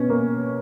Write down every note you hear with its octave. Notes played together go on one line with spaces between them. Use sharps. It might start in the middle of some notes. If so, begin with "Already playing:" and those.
Already playing: B2 C#4
A#3